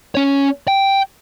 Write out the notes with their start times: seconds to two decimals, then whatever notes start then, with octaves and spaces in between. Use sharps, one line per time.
0.15 C#4 C#5
0.68 G5